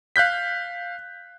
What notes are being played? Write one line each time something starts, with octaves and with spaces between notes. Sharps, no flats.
F5 F#6 G6 B6